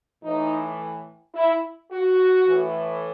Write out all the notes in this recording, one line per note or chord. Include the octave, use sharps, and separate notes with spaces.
A2 E3 D#4
E4
F#4
A2 E3